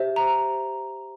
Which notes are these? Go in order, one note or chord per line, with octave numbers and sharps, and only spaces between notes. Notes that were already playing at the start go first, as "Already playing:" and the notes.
Already playing: G4 C5 E5
A#5